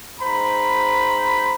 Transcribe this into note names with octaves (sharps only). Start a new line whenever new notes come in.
G#2 C5 A#5 B5